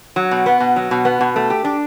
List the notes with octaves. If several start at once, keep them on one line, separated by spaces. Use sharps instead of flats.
F#3
B2
B3
B2
F#3
B2
B3
B2
A3
G4
D4